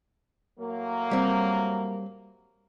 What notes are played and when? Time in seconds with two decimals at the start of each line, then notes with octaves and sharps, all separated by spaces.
0.59 A2 F#3 A#3
1.11 G3 C4